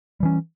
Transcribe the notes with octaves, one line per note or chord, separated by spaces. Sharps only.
E3 G3 C#4